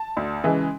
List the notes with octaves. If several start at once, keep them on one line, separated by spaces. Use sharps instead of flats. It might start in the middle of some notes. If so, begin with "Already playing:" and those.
Already playing: A5
D2
C#3 E3 G#3